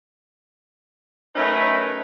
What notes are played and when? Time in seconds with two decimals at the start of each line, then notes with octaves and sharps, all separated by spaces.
1.36 F#2 A3 C#4 D#4 A#4 B4